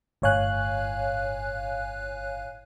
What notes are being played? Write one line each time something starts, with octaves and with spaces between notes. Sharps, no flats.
G1 A2 C#5 F5 G#5 F#6